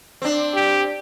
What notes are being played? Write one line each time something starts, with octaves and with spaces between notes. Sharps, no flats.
C4 D4
G4